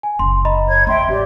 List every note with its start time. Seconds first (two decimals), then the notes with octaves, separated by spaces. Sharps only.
0.03 G#5
0.19 F#1 C6
0.45 D#5 A#5 B5
0.67 C#5 G#6
0.87 E2 E5 G5 C6
1.09 G#1 G4 D5